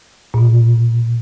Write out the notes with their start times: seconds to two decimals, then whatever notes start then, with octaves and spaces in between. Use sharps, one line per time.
0.34 A#2
0.38 B2